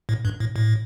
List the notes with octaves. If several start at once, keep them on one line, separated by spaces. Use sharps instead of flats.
A2
G2
A2
A2